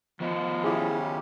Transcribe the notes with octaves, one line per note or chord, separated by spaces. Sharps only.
D#3 F3 B3 D#5
C#3 C#4 E4 G4 G#4